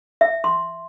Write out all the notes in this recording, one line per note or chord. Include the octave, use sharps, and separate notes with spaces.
E5
C6